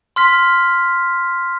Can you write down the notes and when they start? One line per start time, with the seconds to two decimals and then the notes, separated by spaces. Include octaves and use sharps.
0.16 C6 F6 B6